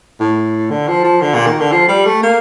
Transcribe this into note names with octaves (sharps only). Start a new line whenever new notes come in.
A2
D3
F3
F3
D3
A#2
D#3
D3
F3
G3
A3
A#3